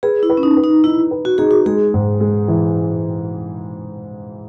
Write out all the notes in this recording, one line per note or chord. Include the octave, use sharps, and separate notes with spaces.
G#4 B4
E4
B4
C#4
D#4
B4
D#4
D#4 E4
B4
F#4
D#4 G#4
F#4
G#3 G#4
G#2
G#3
E3